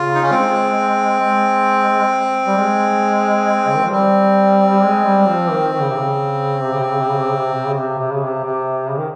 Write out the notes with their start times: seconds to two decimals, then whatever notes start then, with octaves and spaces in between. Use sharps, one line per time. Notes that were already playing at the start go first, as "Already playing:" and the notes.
Already playing: C#3 F4
0.15 D#4
0.23 C#4
0.31 G#3 C4
1.21 G#3
2.46 G3
2.57 G#3
3.67 C#3
3.75 D#3
3.84 F3
3.92 G3 C4
4.83 G#3
5.05 G3
5.28 F3
5.50 D#3
5.73 D#3
5.81 C#3
5.89 C3
5.98 C#3
6.63 C3
6.73 C#3
6.82 C3
6.92 C#3
7.01 C3
7.10 C#3
7.20 C3
7.29 C#3
7.39 C3
7.54 C3
7.67 C#3
7.79 C3
7.98 C3
8.11 C#3
8.24 C3
8.44 C3
8.89 C#3
8.98 D#3